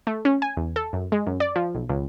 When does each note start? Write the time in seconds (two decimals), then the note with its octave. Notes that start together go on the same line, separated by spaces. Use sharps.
0.07 A3
0.25 C#4
0.42 G#5
0.57 E2
0.76 A4
0.93 F#2
1.12 G#3
1.26 F#2
1.40 D5
1.56 F3
1.75 B1
1.89 C#2